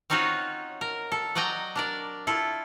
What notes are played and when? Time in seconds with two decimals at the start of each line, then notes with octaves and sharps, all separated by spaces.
0.10 C4 C#4 D#4 F4 F#4 C#5
0.81 A#4
1.12 A4
1.35 F#3 D5 D#5 G5 A#5
1.76 D4 A#4 D5
2.27 E4 F4 A4